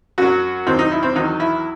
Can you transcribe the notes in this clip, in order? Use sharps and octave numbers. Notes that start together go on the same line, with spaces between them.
F#2 F#3 F#4
D#2 D#3 F#3 C4
D#4
E4
C4
E2 D#3 F#3 D#4
E4